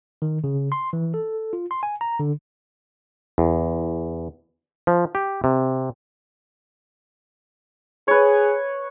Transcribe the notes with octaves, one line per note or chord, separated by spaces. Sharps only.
D#3
C#3
C6
E3
A4
F4
C6
G#5
A#5
D3
E2
F3
G4
C3
G#4 B4 C#5